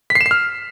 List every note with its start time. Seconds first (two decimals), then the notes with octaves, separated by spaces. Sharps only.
0.10 B6
0.15 C7
0.21 E7
0.26 C7
0.31 F6